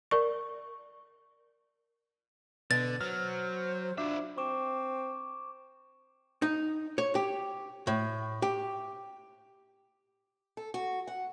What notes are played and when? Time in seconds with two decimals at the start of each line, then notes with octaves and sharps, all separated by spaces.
0.11 A#4 D5 C#6
2.71 B2 D3 A6
3.01 F#3 C5 F6
3.17 C5
3.98 D4 F4 F#4 E5
4.38 C4 C#6 D6 E7
6.42 D#4
6.98 C#5
7.15 G4
7.87 A2
8.42 G4
10.57 A4
10.74 F#4
11.07 F#5